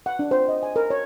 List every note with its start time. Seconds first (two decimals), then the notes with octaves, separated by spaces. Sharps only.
0.06 F#5
0.19 D4
0.31 C5
0.48 D#5
0.63 G#5
0.76 A#4
0.90 C#5